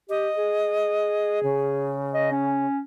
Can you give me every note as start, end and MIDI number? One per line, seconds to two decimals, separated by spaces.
0.10 0.29 67
0.10 1.40 75
0.37 2.00 68
1.43 2.66 49
2.15 2.29 75
2.31 2.81 61